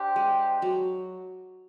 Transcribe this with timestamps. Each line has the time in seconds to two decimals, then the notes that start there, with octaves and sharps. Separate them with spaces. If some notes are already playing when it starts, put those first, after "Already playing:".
Already playing: D4 G4 C5
0.16 G#3
0.62 F#3